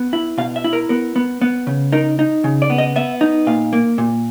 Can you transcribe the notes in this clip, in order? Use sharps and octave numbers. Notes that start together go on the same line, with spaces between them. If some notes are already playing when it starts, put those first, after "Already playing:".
Already playing: B3
E4
B2 F5
E5
E4
A#4
B3 A#4
B3
B3
C#3
D#4 A#4
D#4
C#3
D5
B3
D#5
B3 E5
D#4
A#2 F5
A#3
A#2